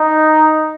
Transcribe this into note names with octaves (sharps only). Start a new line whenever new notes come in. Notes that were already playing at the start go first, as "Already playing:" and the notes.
Already playing: D#4